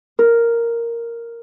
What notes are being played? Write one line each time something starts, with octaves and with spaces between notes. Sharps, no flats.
A#4